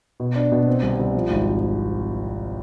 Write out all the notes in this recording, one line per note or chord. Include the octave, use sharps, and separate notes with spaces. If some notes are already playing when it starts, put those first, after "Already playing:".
B2
D4
B2
C4
C2
C2
F3
G#1